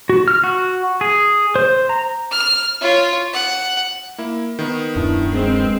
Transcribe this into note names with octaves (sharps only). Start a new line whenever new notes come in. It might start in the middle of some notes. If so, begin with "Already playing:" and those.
F#4
F6
F#4
G#4
C5
A#5
F6
F4 C#5
F#5
A#3 E4
D#3 B3
D1 F#2 D4 E4
G#3 C4